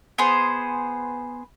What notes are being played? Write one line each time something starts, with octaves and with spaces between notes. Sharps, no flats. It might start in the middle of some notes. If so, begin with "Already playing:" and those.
B3 G#4 C5